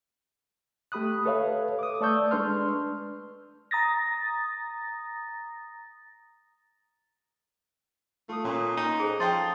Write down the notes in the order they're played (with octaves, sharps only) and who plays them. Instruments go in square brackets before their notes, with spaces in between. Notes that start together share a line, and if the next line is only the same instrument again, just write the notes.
[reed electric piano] A3 G4 B5 D#6 F#6
A4 B4 C#5 E5 F5
D6 D#6
A3 D5 A5 C#6 E6 G6
G#3 D4 B4 C6 F6
[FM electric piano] A#5 D#6 A6 A#6
[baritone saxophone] A3 [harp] F4 D#6
[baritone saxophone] A#2 [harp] C#4
[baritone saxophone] D#4
[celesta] G#4 A4 C5
[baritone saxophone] F3 [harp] F5 G5 D#6 [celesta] C6 A6